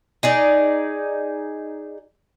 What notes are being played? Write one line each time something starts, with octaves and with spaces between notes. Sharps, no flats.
D#4 G#4 D5